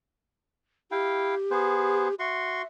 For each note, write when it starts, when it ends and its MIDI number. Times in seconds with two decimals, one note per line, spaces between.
0.91 1.35 64
0.91 2.15 67
0.91 1.35 77
0.91 1.35 79
1.51 2.08 59
1.51 2.08 68
1.51 2.08 72
2.19 2.62 66
2.19 2.67 76
2.19 2.62 84
2.19 2.62 85